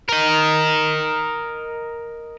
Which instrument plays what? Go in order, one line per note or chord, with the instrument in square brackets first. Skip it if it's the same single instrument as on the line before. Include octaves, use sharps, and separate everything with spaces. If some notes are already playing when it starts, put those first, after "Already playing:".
[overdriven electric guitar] A#4 D#5